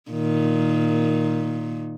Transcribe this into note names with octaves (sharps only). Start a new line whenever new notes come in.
A#2 D#3